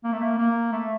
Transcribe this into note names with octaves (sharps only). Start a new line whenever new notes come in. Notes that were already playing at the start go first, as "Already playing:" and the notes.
A#3
A3
A#3
A#3
A3